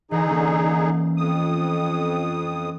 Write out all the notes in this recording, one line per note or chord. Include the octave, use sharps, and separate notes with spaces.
D3 E3 D#4 G#4 B4 D#5
E3 A#3 C#4
F2 D#6